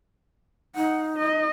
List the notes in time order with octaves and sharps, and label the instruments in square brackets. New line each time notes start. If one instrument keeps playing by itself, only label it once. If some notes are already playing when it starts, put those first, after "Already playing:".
[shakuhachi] D#4 [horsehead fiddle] F#5
[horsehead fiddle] D#5